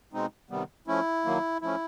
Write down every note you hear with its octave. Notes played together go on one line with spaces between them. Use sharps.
B2 G#3 C4 D#4
C3 D#3 G3 B3
F3 A3 C#4 E4
D#3 F#3 A#3
F3 A3 C#4 E4